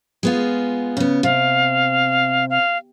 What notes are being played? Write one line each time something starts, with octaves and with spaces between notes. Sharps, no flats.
G#3 B3 F4
C#3 B3
C3 F5
F5